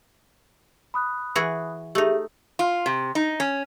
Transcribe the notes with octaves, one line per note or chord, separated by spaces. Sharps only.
B5 D#6 F#6
E3 F#4 G#4
A3 D#4 G4 G#4 E5
F4
C3
D#4
C#4